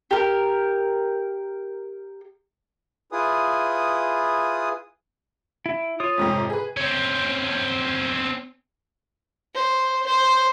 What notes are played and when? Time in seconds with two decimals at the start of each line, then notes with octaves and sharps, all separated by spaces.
0.11 G4 A#4
3.12 E4 F4 G#4 B4 G#5 D#6
5.66 E4
6.00 F4 C#5 D#6
6.18 F2 G#2 C3
6.50 G#4 B4
6.77 C4 C#4
9.54 C5
10.06 C5